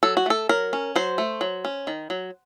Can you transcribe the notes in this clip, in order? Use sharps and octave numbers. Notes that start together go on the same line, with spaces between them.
F#3 A4
F#4
A3 A4
F#3 A#4
C#4
F#3 C5
A3
F#3
C#4
D#3
F#3